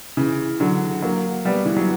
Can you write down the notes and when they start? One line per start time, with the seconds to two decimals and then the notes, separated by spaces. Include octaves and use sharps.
0.17 C#3 E3
0.60 D3 F#3
1.02 F#3 A#3
1.45 G3 B3
1.65 E3
1.77 F#3